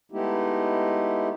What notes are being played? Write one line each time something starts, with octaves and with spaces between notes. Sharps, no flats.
G#3 A3 B3 D#4 E4 G4